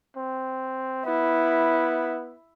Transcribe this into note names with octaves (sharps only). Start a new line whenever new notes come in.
C4
B3 E4